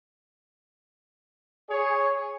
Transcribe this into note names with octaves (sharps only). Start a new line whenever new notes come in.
G#4 C#5